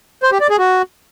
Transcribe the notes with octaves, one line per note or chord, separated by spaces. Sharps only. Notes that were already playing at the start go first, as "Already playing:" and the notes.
C5
G4
D5
G#4
F#4